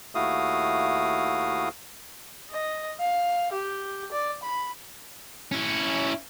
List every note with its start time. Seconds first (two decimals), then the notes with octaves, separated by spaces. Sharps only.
0.15 D#2 A3 E4 F#4 F5 D#6
2.50 D#5
3.00 F5
3.52 G4
4.12 D5
4.43 B5
5.52 C#4 E4